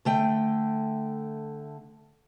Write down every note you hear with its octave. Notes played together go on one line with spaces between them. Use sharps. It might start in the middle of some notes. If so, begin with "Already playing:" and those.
D3 A3 G5